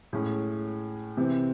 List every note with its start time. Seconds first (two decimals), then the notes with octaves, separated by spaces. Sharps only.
0.13 A2 G#3 C#4
1.17 C3 E3 C4